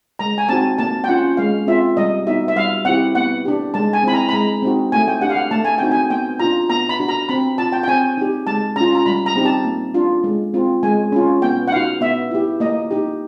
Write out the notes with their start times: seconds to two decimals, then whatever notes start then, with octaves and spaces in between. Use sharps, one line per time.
0.19 G#3 A#5
0.38 G#5
0.49 C4 D#4 F#4 A5
0.78 A#3 A5
1.04 G5
1.08 C#4 F4 F#5
1.37 G#3 F5
1.67 C4 F4 E5
1.97 G3 D#5
2.27 B3 D#4 F#4 E5
2.48 E5
2.56 G3 F5
2.85 C4 E4 G4 F#5
3.15 B3 F#5
3.45 D4 G4
3.74 G#3 A5
3.93 G#5
4.03 C4 E4 B5
4.13 A#5
4.29 B5
4.33 G#3 A#5
4.62 C4 D#4 F#4
4.92 A3 G#5
5.08 G5
5.21 D4 G4 F#5
5.30 F5
5.36 F#5
5.51 A3 A5
5.65 G#5
5.78 C4 D#4 F#4 G5
5.91 G#5
6.10 B3 G5
6.39 D4 F4 A#5
6.70 B3 A#5
6.89 B5
7.00 D4 F#4
7.08 A#5
7.29 C4 B5
7.58 F4 A5
7.72 G5
7.83 G5
7.88 C4 G#5
8.18 D#4 G4
8.47 G#3 A5
8.76 C#4 F4 A#5
8.95 A#5
9.06 G3 B5
9.26 A#5
9.36 C4 D#4 G4
9.45 A5
9.65 A#3
9.94 D4 F4
10.24 G#3
10.54 C4 F4
10.83 G#3 G#5
11.12 C#4 F4
11.42 B3 G5
11.68 F#5
11.72 D#4 F#4 F5
12.01 B3 E5
12.31 E4 G4
12.60 A#3 D#5
12.91 D#4 G4